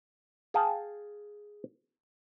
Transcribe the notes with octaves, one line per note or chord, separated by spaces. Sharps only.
G#4 F5 G5 A5